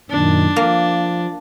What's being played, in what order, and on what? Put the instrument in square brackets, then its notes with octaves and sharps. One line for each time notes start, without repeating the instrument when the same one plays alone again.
[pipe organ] F#2 A#2 D#3 [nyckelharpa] D4
[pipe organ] F3 [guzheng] A#3